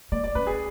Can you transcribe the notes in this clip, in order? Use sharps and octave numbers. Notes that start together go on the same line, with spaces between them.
A#3 D5
D5
C#4 B4
G#4